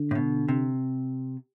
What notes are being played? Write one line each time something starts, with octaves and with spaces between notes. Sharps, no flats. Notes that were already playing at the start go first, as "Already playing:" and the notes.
Already playing: D3
A2
B2
C3